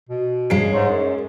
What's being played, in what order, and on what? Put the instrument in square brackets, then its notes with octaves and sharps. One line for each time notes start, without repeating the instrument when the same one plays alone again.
[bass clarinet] B2
[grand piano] G2 C7 D7 [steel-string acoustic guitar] G#3 C#4
[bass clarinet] G#2 [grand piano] C#5 C6
[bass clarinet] F#2